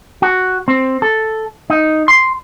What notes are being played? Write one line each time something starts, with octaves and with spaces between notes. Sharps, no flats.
F#4
C4
A4
D#4
C6